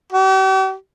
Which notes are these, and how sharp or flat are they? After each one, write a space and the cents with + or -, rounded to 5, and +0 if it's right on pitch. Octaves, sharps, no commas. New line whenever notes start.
G4 -45